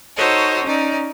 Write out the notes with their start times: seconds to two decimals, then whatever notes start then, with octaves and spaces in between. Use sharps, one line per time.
0.16 D#4 F#4 A4 C5 C#5 D#5
0.64 C#4 D#4 D5